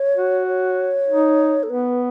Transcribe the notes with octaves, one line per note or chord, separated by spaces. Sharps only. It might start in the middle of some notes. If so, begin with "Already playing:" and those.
Already playing: C#5
F#4
C#5
D#4
A4
B3 B4